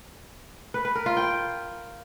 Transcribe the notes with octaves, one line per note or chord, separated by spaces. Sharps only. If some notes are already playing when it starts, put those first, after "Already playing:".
B4
B4
A#4
F4
G5